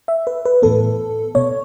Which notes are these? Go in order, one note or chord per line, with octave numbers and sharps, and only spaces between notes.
E5
B4
B4
A2 E3 B3 A4
B2 B3 C#5